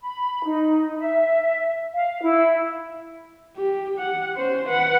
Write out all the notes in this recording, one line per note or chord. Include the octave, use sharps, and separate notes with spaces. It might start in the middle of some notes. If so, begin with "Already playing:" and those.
B5
D#4
E5
F5
E4
G4
G4 F#5
C#4 C5
B4 F#5